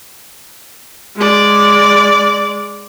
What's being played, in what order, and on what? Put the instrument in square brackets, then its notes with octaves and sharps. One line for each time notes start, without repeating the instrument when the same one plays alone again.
[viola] G#3 D5